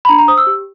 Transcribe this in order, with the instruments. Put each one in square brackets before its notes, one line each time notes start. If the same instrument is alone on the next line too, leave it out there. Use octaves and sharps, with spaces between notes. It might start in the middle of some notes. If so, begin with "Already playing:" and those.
[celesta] B5
D4 A#5
A#5
C5 D#6
E6
G4